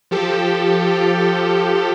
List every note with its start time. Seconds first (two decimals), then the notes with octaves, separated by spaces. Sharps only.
0.11 F3 G4 A4